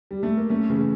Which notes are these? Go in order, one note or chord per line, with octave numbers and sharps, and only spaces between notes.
G3
A3
A#3
A3 C#4
C#3 E3